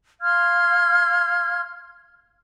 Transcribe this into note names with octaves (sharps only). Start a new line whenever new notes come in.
F5 C6 F6 G#6